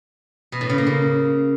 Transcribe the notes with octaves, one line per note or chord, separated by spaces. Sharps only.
B2
A2
C#3
A#3
C#3